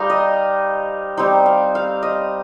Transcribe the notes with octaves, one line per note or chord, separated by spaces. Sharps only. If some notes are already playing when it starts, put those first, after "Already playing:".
Already playing: G3 D#4 C5 F5
D#5
G3 C4 D#4 C5
F5
F5
D#5